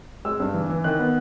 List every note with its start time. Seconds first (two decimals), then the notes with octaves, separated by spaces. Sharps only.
0.25 G#3 E6
0.40 G2
0.54 E3
0.70 E3
0.84 D#3 F#6
0.99 B3